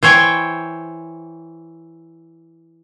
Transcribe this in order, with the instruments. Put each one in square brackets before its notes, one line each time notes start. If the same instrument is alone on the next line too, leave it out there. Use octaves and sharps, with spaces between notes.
[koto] E3 C5 C#5 G5